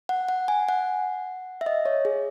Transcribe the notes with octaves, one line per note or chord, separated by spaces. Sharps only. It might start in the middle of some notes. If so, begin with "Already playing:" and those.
F#5
F#5
G#5
F#5
E5
D#5
C#5
G#4